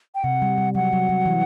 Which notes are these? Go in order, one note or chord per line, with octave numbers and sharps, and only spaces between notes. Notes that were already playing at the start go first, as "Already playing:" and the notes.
G5
C3 F#5
G3
G3
F#3 F#5
F#3
F#3
E3